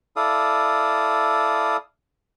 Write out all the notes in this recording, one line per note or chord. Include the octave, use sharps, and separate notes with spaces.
E4 A4 D5 F5 D#6